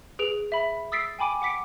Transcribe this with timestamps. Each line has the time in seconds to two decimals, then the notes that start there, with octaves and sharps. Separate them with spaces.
0.19 G#4 B4 D7 F7
0.52 E5 B5
0.92 D#6 E6 A6 B6 C7 D7
1.19 G5 G#5 B5 D6 D7 D#7
1.42 F#5 D6 B6 C#7 D7